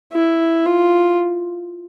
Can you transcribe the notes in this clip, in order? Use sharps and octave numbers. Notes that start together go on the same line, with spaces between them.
E4
F4